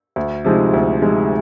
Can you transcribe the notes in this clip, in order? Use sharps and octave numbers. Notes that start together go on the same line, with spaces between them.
D2
C3 F3 G#3 D#4
D2
C3 F3 G#3 D#4